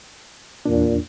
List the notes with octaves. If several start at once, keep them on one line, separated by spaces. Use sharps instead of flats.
E2 A#2 D4